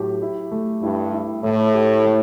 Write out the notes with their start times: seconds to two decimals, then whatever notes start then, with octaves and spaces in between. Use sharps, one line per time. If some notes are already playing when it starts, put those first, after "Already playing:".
Already playing: A2 F#3 G4
0.22 E4
0.51 A3
0.83 G2 E4
1.13 E4
1.44 A2 A3
1.75 G4
2.05 A3